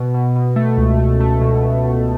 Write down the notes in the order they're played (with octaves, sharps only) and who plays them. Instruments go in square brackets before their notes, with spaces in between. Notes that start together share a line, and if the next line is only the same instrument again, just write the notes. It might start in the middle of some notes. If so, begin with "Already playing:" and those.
Already playing: [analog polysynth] B2
B2
B2
A3
C#2
A3
A3
B2
C#2
C#2